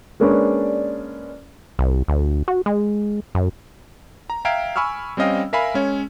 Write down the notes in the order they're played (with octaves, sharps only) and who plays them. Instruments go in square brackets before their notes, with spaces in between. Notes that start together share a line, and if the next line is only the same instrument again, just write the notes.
[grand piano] G#3 A#3 C#4 D4 B4 D5
[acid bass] C2
D2
F#4
G#3
F#2
[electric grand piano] A#5
E5 F5 G5 A#5 G#6 D7
G#5 B5 C#6 E6 F6
G3 C4 C#4 D#5 F5 G5
A#4 E5 F5 G#5 B5
G#3 C#4 C#5